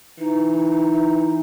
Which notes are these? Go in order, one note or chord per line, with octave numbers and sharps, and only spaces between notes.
E3 D#4